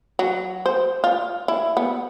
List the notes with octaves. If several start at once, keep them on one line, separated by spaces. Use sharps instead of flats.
F#3
C5
F4
E4
B3